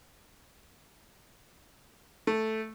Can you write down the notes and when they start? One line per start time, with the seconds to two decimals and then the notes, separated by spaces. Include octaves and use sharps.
2.27 A3